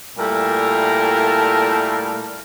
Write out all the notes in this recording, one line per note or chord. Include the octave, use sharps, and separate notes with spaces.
A#2 G3 A3 E4 A#4 A5